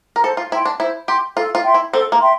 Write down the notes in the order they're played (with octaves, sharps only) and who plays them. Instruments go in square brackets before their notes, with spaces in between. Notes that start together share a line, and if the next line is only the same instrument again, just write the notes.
[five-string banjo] A#4
[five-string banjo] A4 [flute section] C5
[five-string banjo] F4
[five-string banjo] E4 [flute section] G5 C6
[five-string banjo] D4
[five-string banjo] E4 [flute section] C5
[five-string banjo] G4 [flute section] G5 C6
[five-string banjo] F4 [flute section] A4
[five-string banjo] F4
[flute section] E5 G5 C6
[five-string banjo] E4
[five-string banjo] C4 [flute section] A4
[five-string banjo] A#3
[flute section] E5 G5 C6